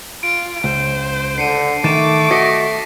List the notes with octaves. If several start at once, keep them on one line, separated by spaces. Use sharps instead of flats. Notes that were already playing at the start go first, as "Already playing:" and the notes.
F4 D7
C#2 C5
D3 C7 C#7 D#7
D#3 A3 D6 A6 D#7 E7
F#4 D#5 A#6 B6 C#7